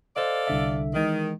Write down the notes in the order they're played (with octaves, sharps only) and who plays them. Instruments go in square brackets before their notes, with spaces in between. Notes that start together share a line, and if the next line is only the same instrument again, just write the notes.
[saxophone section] A4 D5 F5 [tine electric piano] C5 D#5
[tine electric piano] C2 D3 E5
[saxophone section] D#3 [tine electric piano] E3 G#3